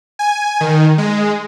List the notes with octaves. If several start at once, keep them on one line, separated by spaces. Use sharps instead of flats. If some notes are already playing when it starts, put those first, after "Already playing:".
G#5
D#3
G#3